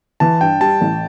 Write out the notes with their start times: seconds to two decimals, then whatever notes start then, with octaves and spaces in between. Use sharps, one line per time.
0.20 E3 A5
0.41 G2 G5
0.60 G3 A5
0.81 A1